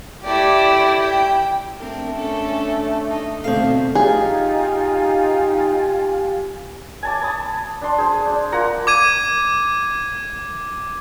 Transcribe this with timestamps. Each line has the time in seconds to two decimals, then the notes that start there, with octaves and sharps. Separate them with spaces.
0.24 A3 E4 G4 D5
0.99 G5
1.79 A3 C4 D4 A#4
2.14 C#4 D4 A4
3.09 D#4
3.44 D2 B2 D#3 C4 A4 F5 C7
3.95 D#4 F4 G4 G#4 G#5
7.03 G#5 A5 D6
7.21 A5 B5 D#6
7.81 D4 C6
7.98 G#4 C5
8.25 D4
8.52 A#3 F4 F#5 A#5
8.87 D6 G#6 D#7